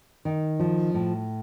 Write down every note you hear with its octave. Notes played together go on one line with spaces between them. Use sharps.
D#3
F3
A2